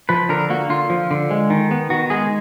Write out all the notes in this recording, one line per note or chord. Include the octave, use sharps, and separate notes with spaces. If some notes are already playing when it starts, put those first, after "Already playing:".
F3 B4
D3 A#4
A#3 F#4
D3 F4
F3
D3
G#3
D#3
B3
D#3 F#4
G#3 G#4